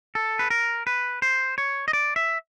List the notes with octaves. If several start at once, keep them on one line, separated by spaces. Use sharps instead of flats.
A4
B4
A#4
B4
C5
C#5
D#5
D5
E5